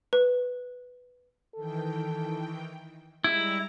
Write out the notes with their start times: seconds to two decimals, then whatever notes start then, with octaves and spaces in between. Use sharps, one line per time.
0.13 B4
1.56 D#3 E3 A4 G5
3.24 G3 G#3 E4 A#5